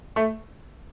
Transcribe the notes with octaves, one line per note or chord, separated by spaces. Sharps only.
A3